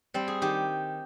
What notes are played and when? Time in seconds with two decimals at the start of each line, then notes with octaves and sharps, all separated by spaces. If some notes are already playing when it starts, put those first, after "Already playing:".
0.14 G3 C4
0.28 G#4
0.42 D#3 G4